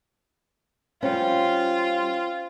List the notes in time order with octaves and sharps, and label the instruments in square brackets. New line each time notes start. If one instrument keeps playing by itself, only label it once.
[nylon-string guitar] G3 C#4 [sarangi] F4 [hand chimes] C5 G5